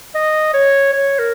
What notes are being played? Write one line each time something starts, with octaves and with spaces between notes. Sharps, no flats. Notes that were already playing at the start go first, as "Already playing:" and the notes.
D#5
C#5
C#5
A#4